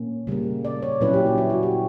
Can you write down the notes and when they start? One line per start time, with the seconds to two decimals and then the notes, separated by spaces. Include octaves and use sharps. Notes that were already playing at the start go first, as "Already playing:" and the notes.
Already playing: A#2 A#3 C#4
0.27 C#3 G3 A#3
0.65 D5
0.82 C#5
1.01 A#2 F#3 C#4 E4 B4
1.13 G4
1.26 E4
1.38 E4
1.50 F#4
1.63 G4